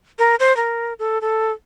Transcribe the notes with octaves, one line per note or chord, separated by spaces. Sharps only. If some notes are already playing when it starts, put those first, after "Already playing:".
A#4
C5
A#4
A4
A4